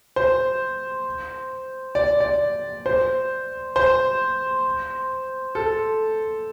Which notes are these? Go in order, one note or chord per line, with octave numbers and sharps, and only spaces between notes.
C5
D5
D5
C5
C5
A4